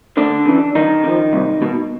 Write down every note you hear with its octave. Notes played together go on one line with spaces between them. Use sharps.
D2 D3 D4
C#3 E3
F#2 D#3 D#4
D3
F3
C2
B2